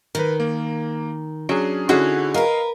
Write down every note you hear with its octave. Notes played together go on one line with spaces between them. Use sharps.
D#3 A#4 B4
A#3
F#3 C#4 D4 G#4
D3 C#4 D#4 E4 F#4 G#4
A#4 B4 D#5 F5